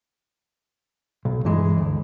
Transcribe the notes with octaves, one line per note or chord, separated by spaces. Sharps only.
B1
G2 E3 G#3
D2